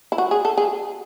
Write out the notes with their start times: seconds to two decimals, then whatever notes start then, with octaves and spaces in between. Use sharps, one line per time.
0.12 E4
0.18 F#4
0.31 G#4
0.45 A4
0.58 G#4